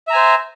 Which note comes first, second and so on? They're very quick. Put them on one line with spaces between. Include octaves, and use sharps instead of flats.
E5 A#5 G#5 C5